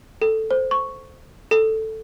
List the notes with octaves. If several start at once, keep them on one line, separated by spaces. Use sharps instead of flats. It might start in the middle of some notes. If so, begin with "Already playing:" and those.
A4
C5
C#6
A4